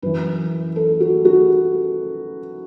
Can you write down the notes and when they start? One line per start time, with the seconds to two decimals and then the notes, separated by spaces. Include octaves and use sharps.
0.02 F#2 E3 B4
0.76 A4
1.00 F#4
1.25 F#4